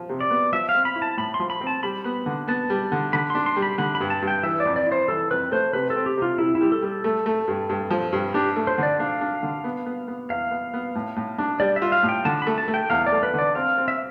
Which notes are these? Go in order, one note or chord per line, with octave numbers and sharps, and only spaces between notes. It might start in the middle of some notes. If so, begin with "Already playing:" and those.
Already playing: F3
C3
D5
B3
F3 E5
F5
C4
B5
E4
A5
A2 B5
C6
F3
B5
C4
A5
G3 B5
B3 B5
D3
B3 A5
G3
D3
D3 B5
D4 C6
C6
G3
B5
D3 B5
B5
G2
A5
G2
G5
E3 E5
D5
F2
D5
E4
C5
E3 A4
F2 B4
A3 C5
C3 B4
A4
C4
G4
C3 F4
C3 E4
E4
G3 G4
A4
G3
A4
A3
A3
G2
G2
F3
G2
D4 G4
A3
C5
D3 D5
D4 F5
D4
D3
B3
B3
B3
E2 F5
B3
B3
A2
A2
D4
G3 D5
E5
F4
F5
A2
G5
D3 A5
A3 B5
A5
A3
G5
E2 F5
D5
A3
B4
D3 D5
C4 F5
C4
E5